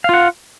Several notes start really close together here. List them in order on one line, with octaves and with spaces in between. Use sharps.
F5 F4 F#5